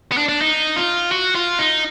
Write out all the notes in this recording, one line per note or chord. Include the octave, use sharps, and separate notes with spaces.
B3
D4
D4
D#4
F4
F#4
F4
D#4